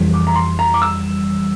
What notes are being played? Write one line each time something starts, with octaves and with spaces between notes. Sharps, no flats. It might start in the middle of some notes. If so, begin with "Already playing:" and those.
Already playing: F2 E3 G3
D6
A#5
C6
A#5
D6
E6